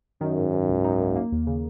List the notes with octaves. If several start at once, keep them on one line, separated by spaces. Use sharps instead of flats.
F#2 D#3
G#2
G#2
C#2
D#4
A#3
A#3
D#2
C#3